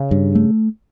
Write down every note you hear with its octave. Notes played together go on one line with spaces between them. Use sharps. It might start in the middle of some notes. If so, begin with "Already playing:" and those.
Already playing: C#3
G2
A3